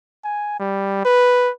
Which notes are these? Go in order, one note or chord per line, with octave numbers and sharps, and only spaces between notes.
G#5
G3
B4